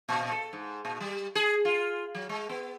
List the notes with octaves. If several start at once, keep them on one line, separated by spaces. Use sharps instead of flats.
A#2
A4
G#2
A#2
G3
G#4
F4
F#3
G#3
B3